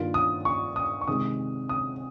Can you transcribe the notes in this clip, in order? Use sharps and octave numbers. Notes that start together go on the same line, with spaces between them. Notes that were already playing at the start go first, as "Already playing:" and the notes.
Already playing: G2 D#3 A#3 F4
D#6
C#6
D#6
C#6
C3 D#3 G#3 D#4 D#6
D#6